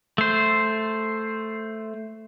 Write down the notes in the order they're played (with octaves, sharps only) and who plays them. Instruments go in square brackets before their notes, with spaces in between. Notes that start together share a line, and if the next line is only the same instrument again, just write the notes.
[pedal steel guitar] A3 C5